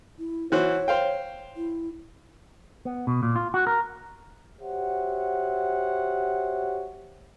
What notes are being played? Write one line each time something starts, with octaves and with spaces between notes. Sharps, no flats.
E4
E3 F#4 C5 C#5
C5 F5 G5
E4
B3
B2
A#2
F4
F#4
A#4
F#4 G4 C5 C#5 E5 F#5